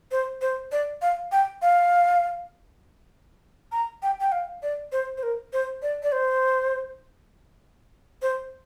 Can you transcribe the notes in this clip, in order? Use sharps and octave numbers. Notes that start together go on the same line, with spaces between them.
C5
C5
D5
F5
G5
F5
A#5
G5
G5
F5
D5
C5
C5
A#4
C5
D5
D5
C5
C5